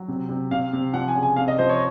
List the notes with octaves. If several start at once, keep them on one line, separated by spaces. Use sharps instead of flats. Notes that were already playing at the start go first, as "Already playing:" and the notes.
Already playing: F#3
C3
C3
C3 F5
C3
F3 F#5
G#5
C#3
G#5
C3 F5
D#5
F3 C5
C#5